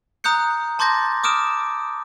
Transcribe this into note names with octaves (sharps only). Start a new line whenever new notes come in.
A#5 D#6 F#6 G6 C#7
A5 C6 D6 G6 A6 A#6
D6 D#6 F6 D7 E7